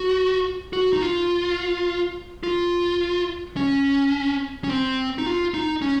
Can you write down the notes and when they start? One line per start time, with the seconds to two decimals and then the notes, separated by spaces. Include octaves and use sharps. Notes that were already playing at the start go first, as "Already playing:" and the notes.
Already playing: F#4
0.73 F#4
0.93 D#4
1.02 F4
2.43 F4
3.57 C#4
4.64 C#4
4.69 C4
5.18 D#4
5.26 F4
5.54 D#4
5.82 C#4